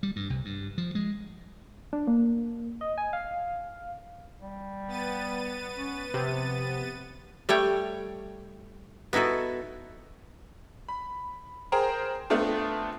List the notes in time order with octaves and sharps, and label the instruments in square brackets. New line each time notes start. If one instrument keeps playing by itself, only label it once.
[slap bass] G3
G2
C2
G2
F3
G#3
[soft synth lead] D4
A#3
D#5
G#5
F5
[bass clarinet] G3
[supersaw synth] B3 A6 D#7
[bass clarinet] C#4
[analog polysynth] C3 [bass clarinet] F3
[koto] G3 A3 C#5 G5
B3 D#4 E4 F#4 A4
[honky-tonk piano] B5
G#4 A#4 C5 G5 A#5
A3 B3 C4 D4 F4